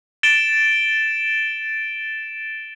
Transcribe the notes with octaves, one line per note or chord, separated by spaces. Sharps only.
A6 D7 E7 G7